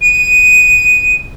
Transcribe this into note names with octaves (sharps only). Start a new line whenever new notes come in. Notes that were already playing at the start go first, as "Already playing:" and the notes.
D#7